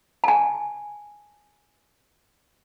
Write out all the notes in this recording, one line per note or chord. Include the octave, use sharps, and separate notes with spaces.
G#5 A5